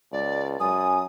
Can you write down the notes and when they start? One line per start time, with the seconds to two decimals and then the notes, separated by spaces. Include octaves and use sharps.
0.12 C#2 D5
0.60 F#2 G#5 D#6